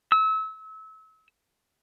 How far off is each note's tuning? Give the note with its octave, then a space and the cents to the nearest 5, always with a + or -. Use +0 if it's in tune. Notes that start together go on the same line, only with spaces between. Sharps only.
E6 -30